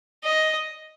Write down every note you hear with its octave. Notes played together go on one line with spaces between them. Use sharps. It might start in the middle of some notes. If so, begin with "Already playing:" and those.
D#5